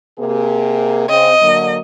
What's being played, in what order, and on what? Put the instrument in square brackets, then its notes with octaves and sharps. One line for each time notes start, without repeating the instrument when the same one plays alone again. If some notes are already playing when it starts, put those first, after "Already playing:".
[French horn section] C3 A#3 G#4
[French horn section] C#3 C4 [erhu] D#5
[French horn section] D3 F#3 A#3